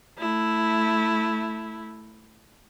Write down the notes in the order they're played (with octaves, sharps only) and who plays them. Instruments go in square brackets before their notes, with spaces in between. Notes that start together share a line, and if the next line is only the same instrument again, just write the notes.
[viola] A3 E4